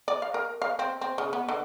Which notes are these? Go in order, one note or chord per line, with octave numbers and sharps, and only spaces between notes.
D5
F5
A#4
F5
C4
C4
C#3
B3
D3